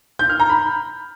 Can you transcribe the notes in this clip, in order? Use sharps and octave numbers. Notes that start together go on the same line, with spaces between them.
G6
F6
A#5
B5